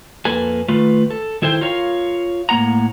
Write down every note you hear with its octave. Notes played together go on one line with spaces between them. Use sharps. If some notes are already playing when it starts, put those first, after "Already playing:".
F2 A#3 A4 B4 G#5
D#3 A3 F4 B4
A4
D#3 E4 A4 C5 G5
F4 A#4 C#5 F5
A2 A#3 F#5 A#5